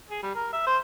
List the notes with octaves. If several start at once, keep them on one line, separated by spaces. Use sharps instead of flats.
G#4
G3
A#4
E5
C5